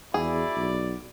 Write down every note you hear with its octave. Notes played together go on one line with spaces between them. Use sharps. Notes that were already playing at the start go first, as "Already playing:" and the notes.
E2 E4 F#4 G#4 D5
B1